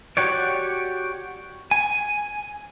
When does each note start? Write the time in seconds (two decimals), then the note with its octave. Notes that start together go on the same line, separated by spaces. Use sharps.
0.17 F#4 G4 C#5 D5
1.71 G#5